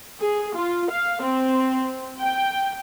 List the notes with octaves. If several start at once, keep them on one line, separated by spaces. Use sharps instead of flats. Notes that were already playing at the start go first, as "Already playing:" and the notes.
G#4
F4
F5
C4
G5